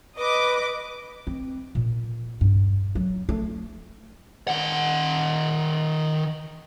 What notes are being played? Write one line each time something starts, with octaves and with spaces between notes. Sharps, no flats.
B4 D#5 D6
C4
A#2
G2
F#3
A3
D#3 F#5